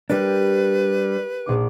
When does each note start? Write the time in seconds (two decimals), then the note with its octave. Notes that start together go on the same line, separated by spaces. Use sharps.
0.10 G3 D4 G4 A#4 B4
1.46 A#1 D#4 D6